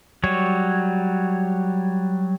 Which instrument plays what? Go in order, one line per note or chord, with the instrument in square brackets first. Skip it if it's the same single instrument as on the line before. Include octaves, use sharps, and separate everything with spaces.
[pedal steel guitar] F#3 G3 C#5